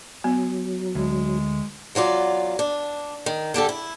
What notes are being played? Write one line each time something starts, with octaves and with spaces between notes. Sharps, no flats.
F#3 B3
D2 G#3
E2 F#3 F4 D5
D4
D#3
D3 D4 G4 A4
E4